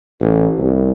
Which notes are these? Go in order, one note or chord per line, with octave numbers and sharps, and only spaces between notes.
A1
C2